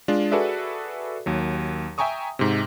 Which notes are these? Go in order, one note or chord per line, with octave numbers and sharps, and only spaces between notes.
G#3 D4 F4
F#4 G#4 A4 B4 D5 E5
D#2 F#3
E5 G5 G#5 A#5 C#6 D#6
G#2 C3